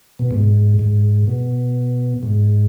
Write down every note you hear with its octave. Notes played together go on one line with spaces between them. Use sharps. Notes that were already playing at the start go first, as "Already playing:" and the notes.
B2
G#2
G#2
B2
G#2